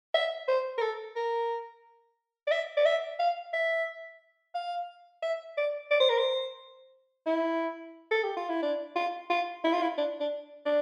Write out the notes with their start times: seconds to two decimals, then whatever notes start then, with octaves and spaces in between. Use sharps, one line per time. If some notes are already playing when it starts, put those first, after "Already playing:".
0.14 E5
0.48 C5
0.78 A#4
0.82 A4
1.16 A#4
2.47 D5
2.51 E5
2.77 D5
2.86 E5
3.20 F5
3.53 E5
4.55 F5
5.23 E5
5.57 D5
5.91 D5
6.00 C5
6.10 A#4
6.18 C5
7.27 E4
8.11 A4
8.24 G4
8.37 F4
8.50 E4
8.63 D4
8.96 F4
9.30 F4
9.64 E4
9.73 F4
9.82 E4
9.98 D4
10.21 D4
10.66 D4